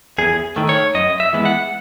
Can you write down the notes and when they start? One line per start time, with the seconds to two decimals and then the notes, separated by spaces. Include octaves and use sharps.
0.18 E2 G#4
0.56 D#3 A3
0.69 C#5
0.95 F#2 D#5
1.20 E5
1.33 E3 G#3 B3
1.45 F#5